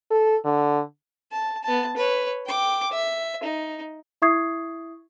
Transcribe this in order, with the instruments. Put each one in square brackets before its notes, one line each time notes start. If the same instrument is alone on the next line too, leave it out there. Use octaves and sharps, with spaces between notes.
[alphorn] A4
D3
[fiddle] A5
B3 A5
B4 C#5
G5 D6
E5
D#4
[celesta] E4 E5 C#6 D#6 G#6 C7